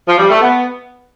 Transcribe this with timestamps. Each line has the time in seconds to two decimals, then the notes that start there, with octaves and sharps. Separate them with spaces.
0.07 F3
0.19 G3
0.30 A3
0.41 B3